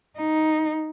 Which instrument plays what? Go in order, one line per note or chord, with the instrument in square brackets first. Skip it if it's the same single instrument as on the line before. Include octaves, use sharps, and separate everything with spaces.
[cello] D#4